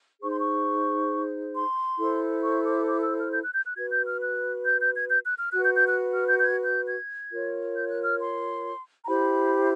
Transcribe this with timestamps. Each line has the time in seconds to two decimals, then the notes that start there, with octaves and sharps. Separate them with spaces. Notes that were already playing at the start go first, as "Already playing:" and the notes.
0.21 D#4 G#4 C5 C#6
0.30 C6
0.38 C#6
1.55 C6
1.99 E4 A4 C5
2.43 C#6
2.66 D6
2.87 D6
3.02 E6
3.18 F6
3.31 G6
3.43 F#6
3.54 G6
3.66 F#6
3.76 F#4 B4 G#6
3.91 G6
4.06 F6
4.21 F#6
4.65 G6
4.79 G6
4.95 G#6
5.09 G6
5.24 F#6
5.39 F6
5.53 F#4 B4 F#6
5.64 G6
5.76 G6
5.87 F#6
6.12 F6
6.28 G6
6.38 G6
6.41 G#6
6.64 G6
6.86 G#6
7.31 F4 A#4 C#5
7.74 G6
7.89 F#6
8.04 F6
8.19 C6
9.04 A#5
9.07 E4 G4 C5 B5